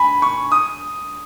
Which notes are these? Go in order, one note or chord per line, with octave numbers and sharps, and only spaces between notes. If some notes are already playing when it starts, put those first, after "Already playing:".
Already playing: G#5 B5
C#6
D#6